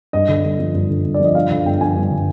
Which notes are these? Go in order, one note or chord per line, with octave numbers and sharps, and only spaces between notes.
G2 D#5
D3
G2
F3
G2
D3
G2
D5
F3 D#5
G2 F5
D3 F5
G2 G5
F3 G#5
G2
D3